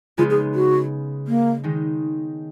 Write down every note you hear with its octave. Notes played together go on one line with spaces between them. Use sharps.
C#3 G#3 B3 D#4 F4
G#4
F#4
A#3
D#3 G#3 D#4